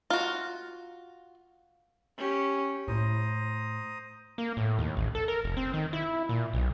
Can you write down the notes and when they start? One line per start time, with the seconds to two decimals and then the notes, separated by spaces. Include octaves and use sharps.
0.10 F4 F#4
2.17 C#4 G4
2.88 A2 C5 A#5 D#6
4.38 A#3
4.57 A2
4.78 D#2
4.97 A1
5.15 A4
5.28 A#4
5.44 F1
5.57 C4
5.74 D#3
5.93 E4
6.29 A#2
6.53 B1